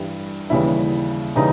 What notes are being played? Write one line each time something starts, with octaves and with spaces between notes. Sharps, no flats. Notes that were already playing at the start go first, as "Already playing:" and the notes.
Already playing: G2 E3 G3
D#2 C#3 E3 G3 E4
C#3 E3 G3 D#4